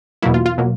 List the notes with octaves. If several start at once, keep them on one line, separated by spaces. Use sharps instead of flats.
E2 B2 F#3 A#3 E4
F4
F4
B2 F#3 A#3